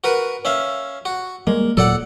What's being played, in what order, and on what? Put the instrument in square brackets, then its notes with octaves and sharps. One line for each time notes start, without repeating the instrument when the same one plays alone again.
[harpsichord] F#4 A#4 B4
C#4 E5 F5
F#4
[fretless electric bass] G3 G#3 [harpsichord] A#3
[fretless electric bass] D#1 A#2 F#3 [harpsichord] A4 D5 F#5